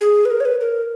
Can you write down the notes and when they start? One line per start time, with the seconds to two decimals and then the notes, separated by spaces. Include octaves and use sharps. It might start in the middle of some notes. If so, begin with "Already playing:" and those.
0.01 G#4
0.25 B4
0.30 A#4
0.40 C#5
0.45 B4
0.61 A#4